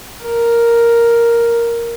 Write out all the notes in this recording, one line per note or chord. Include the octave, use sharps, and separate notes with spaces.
A#4